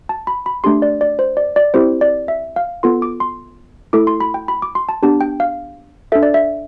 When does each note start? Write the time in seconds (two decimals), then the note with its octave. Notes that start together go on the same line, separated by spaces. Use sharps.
0.09 A5
0.27 B5
0.46 B5
0.64 A3 D4 G4 C6
0.82 D5
1.01 D5
1.19 C5
1.37 D5
1.56 D5
1.74 C4 E4 G4 C5
2.01 D5
2.28 E5
2.56 F5
2.83 B3 F4 A4 C6
3.02 D6
3.20 C6
3.93 A3 E4 A4 D6
4.07 C6
4.20 B5
4.34 G5
4.48 B5
4.62 D6
4.75 C6
4.89 A5
5.03 B3 D4 G4 A5
5.21 G5
5.40 F5
6.12 D4 A4 E5
6.23 D5
6.34 E5